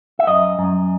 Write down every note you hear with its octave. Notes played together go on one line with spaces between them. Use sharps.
E5
F#2 D#5
F#2